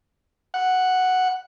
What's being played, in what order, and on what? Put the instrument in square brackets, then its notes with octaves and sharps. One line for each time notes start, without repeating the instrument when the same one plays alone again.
[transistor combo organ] F#5